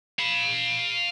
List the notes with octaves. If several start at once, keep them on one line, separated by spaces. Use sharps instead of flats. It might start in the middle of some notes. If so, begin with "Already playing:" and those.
F5 B5